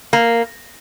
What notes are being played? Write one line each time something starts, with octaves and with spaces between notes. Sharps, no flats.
A#3